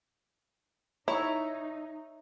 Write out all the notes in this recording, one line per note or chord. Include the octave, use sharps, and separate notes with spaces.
D#4 E4 C#5 E5 A#5 C#6